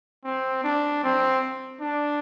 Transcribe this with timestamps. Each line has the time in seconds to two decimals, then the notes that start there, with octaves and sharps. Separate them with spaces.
0.24 C4
0.64 D4
1.03 C4
1.81 D4